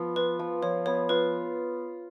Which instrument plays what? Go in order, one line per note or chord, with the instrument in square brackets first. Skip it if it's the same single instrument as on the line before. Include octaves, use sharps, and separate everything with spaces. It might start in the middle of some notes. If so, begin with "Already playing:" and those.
Already playing: [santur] F3 B3
[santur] F4 [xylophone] B4
[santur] F3
[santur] F3 [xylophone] C#5
[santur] B3 [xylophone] C#5
[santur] F4 [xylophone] B4